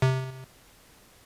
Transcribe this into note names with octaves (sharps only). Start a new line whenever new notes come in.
C3